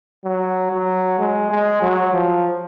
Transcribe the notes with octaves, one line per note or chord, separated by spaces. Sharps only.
F#3
F#3
G#3
G#3
F#3
F3